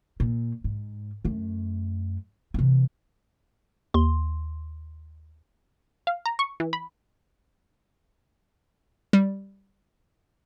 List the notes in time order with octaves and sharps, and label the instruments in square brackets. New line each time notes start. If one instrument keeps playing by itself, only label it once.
[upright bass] A#2
G#2
F#2 A3
C3 E3
[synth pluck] D#2 C6
[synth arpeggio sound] F5
A#5
C#6
E3
B5
G3